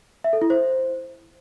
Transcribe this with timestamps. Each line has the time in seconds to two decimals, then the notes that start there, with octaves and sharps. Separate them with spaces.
0.24 E5
0.33 A4
0.42 E4
0.50 C5